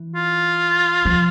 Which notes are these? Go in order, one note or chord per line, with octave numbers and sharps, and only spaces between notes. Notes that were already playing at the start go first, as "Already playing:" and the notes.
Already playing: E3
F4
F3